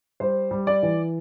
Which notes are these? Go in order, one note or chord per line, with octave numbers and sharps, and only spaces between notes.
G3 C5
G3
D5
E3